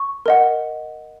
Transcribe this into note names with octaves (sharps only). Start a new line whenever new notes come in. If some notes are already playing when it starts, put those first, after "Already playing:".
Already playing: C#6
A#4 D#5 F#5